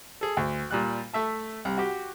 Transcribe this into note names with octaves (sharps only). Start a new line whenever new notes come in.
G#4 A4
D2
A#2 G3 F#6
A3 E5 A5
C2
F#4 G4